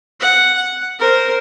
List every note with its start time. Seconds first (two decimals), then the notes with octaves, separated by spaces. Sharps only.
0.20 F#5
0.56 F#5
0.99 A#4 C5